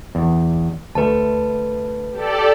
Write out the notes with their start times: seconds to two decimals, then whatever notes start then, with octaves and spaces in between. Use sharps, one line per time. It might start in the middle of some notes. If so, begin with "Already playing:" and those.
0.15 E2
0.95 D2 A3 B4 A5
2.12 G4 A4 D5